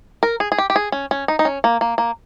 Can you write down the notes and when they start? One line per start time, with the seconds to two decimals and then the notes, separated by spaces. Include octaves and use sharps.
0.23 A#4
0.40 G#4
0.52 G#4
0.58 G4
0.70 G4
0.76 G#4
0.92 C#4
1.11 C#4
1.28 D#4
1.39 D#4
1.45 C#4
1.64 A#3
1.81 A#3
1.98 A#3